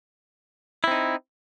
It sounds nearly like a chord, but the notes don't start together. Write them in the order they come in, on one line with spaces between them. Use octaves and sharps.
E4 C4 D#4